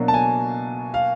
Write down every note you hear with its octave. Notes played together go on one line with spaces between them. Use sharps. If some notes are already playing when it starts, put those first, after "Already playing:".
Already playing: B2 F#3 A#3 D4
A5
G#5
F5